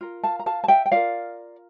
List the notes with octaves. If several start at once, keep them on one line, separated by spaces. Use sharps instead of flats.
F4 A#4
F5 A5
A#5
F5 A5
A5
E5 G5
G5
F4 A#4 D5 F5